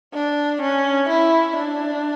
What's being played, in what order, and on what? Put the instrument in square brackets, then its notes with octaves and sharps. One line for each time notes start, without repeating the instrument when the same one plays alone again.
[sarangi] D4
C#4
E4
D4